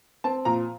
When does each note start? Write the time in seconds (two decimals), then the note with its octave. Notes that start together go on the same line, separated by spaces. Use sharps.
0.24 C4 A5
0.45 A#2 A#5